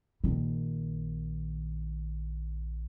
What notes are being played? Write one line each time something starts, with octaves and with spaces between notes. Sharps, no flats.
A#1 D#3